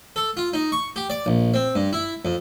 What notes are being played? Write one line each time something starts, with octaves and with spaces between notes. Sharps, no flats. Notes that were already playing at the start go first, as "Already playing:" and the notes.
A4
F4
D#4
C#6
G4
D5
A#1
C4
G2
E4
F2